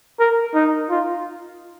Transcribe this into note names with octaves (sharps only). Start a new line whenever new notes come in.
A#4
D#4
F4